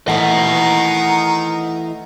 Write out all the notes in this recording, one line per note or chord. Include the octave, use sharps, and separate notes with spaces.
D#3 E3 A3 E4 D#5 F#5 A#5